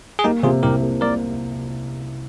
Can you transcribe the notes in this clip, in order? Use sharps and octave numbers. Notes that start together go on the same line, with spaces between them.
G#4
A#3 D#4 G4
C3 F4 G#4
C2 G4 A#4
A#3
A#3 A#4 D5